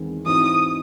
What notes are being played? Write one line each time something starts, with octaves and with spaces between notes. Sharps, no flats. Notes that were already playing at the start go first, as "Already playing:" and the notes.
Already playing: E2 D#3 G#3 C4
G#2 E3 C4 D#4 F#4 D#6